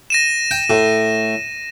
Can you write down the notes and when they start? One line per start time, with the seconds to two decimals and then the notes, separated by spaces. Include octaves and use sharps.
0.10 A#6 D#7 E7
0.51 G5
0.70 A2